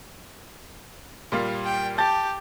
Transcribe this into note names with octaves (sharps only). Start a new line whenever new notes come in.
A#2 G3 F4
G5
G4 A5 G6 A6